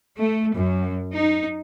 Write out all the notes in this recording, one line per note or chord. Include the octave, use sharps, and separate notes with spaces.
A3
F#2
D#4